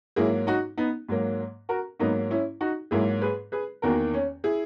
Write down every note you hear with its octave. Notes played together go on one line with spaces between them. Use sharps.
G#2 F#3 A#3 E4 G#4
D#4 F#4
B3 D#4
G#2 F#3 A#3
F#4 A#4
G#2 F#3 A#3 B3 D#4
C#4 E4
D#4 F#4
G#2 F#3 A#3 E4 G#4
G#4 B4
G#4 B4
E2 D#3 A#3 F#4 A#4
C#4
E4 G#4